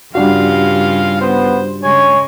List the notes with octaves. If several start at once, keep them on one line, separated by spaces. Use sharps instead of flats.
G2 C#3 G3 D4 F4 F#4 F5
B3 C5
C#3 G#3 C#5 G#5